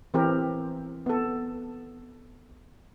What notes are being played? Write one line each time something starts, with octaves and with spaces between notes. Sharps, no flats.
E3 C4 G4 A#4
B3 A4